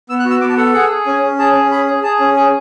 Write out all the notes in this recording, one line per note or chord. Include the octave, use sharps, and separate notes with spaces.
B3 E6
F#6
F#4
E6
B3 D6
A5
A4 F#5
G#4 F#5
G#4
C#4 G#5
C#4
G#4 A5
C#4
G#4 B5
G#4
G#4 A5
C#4
G#4 G#5